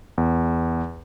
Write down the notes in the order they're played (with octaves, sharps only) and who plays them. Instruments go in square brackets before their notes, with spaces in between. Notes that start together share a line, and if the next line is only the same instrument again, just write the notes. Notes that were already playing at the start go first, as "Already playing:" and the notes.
[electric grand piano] E2